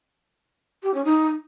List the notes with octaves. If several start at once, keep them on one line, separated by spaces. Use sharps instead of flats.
G4
C#4
D#4